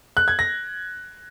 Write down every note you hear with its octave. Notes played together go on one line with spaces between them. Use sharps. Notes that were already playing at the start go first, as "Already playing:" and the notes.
F#6
G#6
A#6